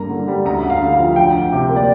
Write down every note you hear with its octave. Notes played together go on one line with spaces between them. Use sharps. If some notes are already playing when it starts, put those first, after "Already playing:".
Already playing: G2 A#3 A#5
D3
G3
D2 A#5
D2
F5
D3
F5
F3
D2 G5
D2
C3
A#3
D5